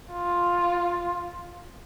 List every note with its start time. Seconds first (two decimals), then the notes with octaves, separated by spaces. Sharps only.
0.12 F4